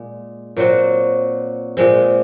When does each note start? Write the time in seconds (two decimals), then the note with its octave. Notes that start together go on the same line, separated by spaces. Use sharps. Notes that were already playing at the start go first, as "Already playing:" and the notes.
Already playing: A#2 G#3
0.57 A#2 F#3 C4 F#4
1.77 A#2 G#3 C4